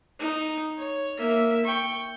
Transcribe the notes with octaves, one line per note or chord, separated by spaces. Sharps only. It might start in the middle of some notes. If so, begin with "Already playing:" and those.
D#4
C#5
A#3 E5
G5 C#6